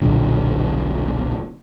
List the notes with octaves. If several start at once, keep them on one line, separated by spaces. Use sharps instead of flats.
D#1 B1 A#2 D3